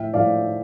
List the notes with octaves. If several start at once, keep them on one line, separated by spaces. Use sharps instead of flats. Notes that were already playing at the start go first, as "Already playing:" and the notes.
Already playing: A2 F3 E5 G5
A2 F3 D5 F5